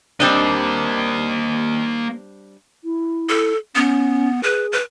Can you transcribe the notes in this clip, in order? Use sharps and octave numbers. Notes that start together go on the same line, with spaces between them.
G3 A#3 C4 D4 D#5
E4
A4
B3 C#4
G#4 B4
B4